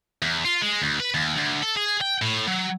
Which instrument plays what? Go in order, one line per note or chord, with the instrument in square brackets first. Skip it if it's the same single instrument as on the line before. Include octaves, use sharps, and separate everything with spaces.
[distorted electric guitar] E2
F4
G#3
D2
B4
D#2
D2
A4
G#4
G5
A2
F#3